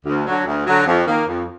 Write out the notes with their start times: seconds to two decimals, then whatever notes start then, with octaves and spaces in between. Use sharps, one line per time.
0.06 D2
0.26 D3 F#3
0.46 D2
0.66 D3 F#3
0.86 F2
1.06 D#3 A#3
1.27 F2